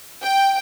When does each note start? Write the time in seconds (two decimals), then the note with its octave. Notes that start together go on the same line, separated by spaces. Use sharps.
0.23 G5